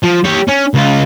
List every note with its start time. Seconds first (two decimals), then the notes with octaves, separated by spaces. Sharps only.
0.03 F3
0.24 G4 C#5
0.48 C#4
0.74 C#2 F4